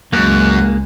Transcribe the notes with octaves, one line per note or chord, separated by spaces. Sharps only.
C#2 F#2 G#3 A#3 F#6